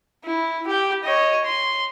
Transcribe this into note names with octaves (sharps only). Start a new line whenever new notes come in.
E4
G4 G5
C#5 D#5
C6